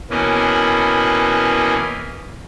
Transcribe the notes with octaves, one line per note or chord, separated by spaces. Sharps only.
B2 E3 A#3 B3 C#4